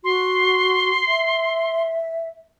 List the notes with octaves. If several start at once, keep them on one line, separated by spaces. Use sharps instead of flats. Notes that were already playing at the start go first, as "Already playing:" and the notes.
F#4 C6
E5